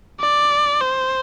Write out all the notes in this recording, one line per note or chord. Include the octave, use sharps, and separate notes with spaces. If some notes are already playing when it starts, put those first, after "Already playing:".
D5
C5